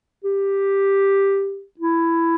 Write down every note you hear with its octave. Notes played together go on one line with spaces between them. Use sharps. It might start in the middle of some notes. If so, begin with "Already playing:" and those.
G4
E4